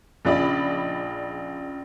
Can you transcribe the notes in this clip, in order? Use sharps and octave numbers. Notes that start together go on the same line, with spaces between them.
A#1 C#3 F4 D5 D#5 B5